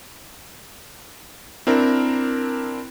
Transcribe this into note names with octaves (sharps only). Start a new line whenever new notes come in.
C4 D4 E4 A#4